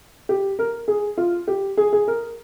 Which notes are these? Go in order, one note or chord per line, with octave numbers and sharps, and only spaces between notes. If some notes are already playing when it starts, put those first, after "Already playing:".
G4
A#4
G#4
F4
G4
G#4
G#4
A#4